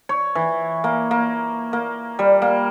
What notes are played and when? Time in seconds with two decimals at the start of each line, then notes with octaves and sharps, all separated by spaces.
0.09 C#5
0.35 E3
0.84 A#3
1.11 A#3
1.73 A#3
2.19 G3
2.42 A#3